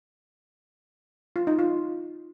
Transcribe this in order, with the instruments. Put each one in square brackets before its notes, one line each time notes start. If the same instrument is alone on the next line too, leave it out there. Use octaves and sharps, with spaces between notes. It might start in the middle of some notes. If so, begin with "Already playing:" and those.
[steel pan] F4
D#4
F4